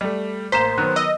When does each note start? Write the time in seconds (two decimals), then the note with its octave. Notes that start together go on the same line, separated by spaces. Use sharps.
0.01 G3 A3
0.52 A1 A#3 C5 A#5 B6 E7
0.78 D#3 F#3 B3 F#6
0.96 D#5 E6